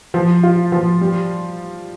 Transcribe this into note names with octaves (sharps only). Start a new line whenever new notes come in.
F3
F4
F3
G3